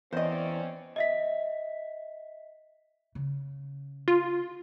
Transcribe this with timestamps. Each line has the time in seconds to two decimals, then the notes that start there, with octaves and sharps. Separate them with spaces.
0.13 E2 C4 C#4 C5 D5 D#5
0.96 D#5 E5 B6
3.15 C#3
4.08 F4